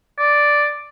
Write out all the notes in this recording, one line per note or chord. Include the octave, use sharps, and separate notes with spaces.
D5